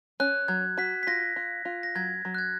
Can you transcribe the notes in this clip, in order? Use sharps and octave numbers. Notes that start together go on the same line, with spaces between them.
C#4 F#6
F#3 G#6
F#4 B6
B6
F4 A#6
F4
F4
A#6
F#3 G#6
F#3
F#6
G#6